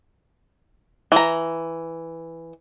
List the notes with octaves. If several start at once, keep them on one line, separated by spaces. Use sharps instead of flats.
E3 A#5